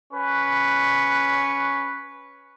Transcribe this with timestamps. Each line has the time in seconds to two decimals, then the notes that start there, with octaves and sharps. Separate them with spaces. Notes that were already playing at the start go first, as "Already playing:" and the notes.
0.13 C#4 B4 C#6